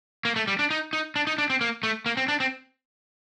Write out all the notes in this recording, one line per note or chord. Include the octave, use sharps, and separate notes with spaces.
A#3
A3
G3
D4
D#4
D#4
D4
D#4
D4
C4
A#3
A3
A#3
C4
D4
C4